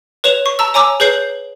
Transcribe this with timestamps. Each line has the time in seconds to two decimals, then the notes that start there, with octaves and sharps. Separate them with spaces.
0.24 B4 C#5 E7 F7
0.46 C#6
0.59 A5 A#5 E6
0.74 C#5 G#5 A#5 D6 E6
1.00 G#4 B4 C#5 G6 C7 F#7